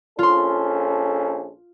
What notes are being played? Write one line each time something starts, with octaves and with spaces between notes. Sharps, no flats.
A#1 C#4 F4 A4 C6